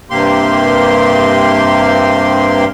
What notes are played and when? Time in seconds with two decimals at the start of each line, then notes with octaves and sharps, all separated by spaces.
0.10 G2 C3 A#3 G4 C6